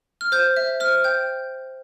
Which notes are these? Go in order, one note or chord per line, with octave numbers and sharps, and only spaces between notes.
F6
C5 G6
E5
C5 F6
G5 G6